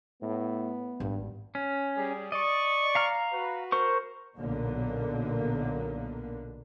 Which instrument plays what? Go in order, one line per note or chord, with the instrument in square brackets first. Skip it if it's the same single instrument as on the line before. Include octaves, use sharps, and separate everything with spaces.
[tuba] A2 [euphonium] B3
[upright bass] G#1 [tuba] G2
[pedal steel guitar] C#4
[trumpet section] G3 G#4
[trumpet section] D5 C#6 [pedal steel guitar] D#5
[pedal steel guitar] F5 A#5 F6
[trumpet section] F#4 B4
[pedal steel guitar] A#4 C5 C#6
[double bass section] B1 A#2 D3 A#3 B3